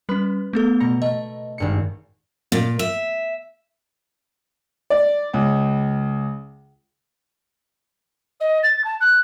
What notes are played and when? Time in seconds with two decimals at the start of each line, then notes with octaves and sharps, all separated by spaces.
0.09 G3 C#4 B4
0.53 A3 B3 A4
0.80 B2 A#5 C#7
1.02 A3 D#5
1.58 G#1 G2 C#7
2.52 A#2
2.79 E5
4.90 D5
5.34 C#2
8.40 D#5
8.63 A6
8.84 A5
9.00 F#6